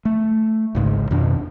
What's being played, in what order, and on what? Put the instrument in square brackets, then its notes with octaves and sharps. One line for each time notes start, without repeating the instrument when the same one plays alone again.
[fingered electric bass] A3
G#1 C#2 G#2
F2 B2 D#3 D4